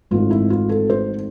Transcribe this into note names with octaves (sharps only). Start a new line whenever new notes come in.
G#1 G#2 E3 A3 C4 F4
E4
F4
A4
C5